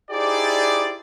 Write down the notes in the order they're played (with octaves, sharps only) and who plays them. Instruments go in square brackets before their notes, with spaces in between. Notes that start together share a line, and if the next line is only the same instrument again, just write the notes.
[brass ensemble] D#4 E4 G4 G#4 C5 D5